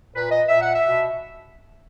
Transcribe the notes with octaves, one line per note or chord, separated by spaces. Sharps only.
A#2 B4
D#5
A#2 E5
F#5
E5
B2